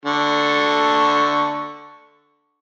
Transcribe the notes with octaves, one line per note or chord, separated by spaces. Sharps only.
D3 A4 C#6